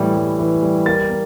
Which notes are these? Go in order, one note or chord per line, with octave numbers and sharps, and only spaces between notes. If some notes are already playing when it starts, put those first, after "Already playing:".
Already playing: A2 E3 G3
G3
E3
G3
A#3 A6
A#3